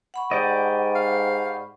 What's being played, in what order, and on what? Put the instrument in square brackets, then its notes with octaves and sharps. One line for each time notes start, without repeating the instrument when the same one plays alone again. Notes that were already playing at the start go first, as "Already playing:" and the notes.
[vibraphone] F#5 B5 C#6
[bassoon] G#2 [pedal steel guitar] G4 D5 D#5
[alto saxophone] F5